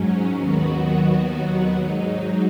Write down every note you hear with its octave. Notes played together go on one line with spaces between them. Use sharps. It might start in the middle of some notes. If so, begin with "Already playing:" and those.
Already playing: G#2 F#3 C#4
D#2 D#3 F#3 B3 F#4
G#2 F#3 D#4